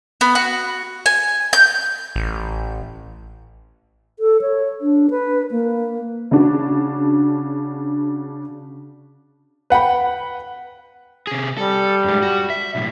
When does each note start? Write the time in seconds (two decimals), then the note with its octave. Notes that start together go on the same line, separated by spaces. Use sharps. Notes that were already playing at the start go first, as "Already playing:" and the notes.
0.21 B3
0.35 F#4
1.06 G#5
1.53 G6
2.16 A1
4.19 A4
4.42 C#5
4.81 D4
5.10 B4
5.51 A#3
6.31 C#3 D4 F#4
9.70 B4 F#5 G5 B5
11.27 C3 G#4
11.58 G3 A4
12.04 F#2 G#3
12.23 F#4
12.50 E5
12.75 B1 A2